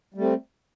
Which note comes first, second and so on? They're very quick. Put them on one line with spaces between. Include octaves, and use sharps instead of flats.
G3 A3 C4